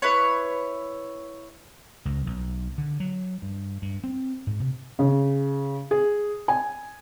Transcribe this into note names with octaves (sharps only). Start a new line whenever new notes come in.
E4 B4 C#5
C#2
B1
D3
F#3
G2
G2
C4
G#2
C3
C#3
G#4
G#5